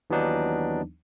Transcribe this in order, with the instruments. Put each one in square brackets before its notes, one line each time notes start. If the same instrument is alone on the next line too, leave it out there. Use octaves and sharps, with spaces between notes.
[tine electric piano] D#2 E3 F#3 B3 D4 D#4